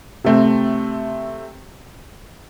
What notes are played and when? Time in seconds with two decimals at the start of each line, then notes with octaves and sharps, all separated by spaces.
0.24 C3 A3 C4